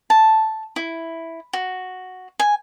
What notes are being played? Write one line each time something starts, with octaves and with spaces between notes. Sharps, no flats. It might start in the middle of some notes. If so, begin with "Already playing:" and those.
A5
E4
F#4
G#5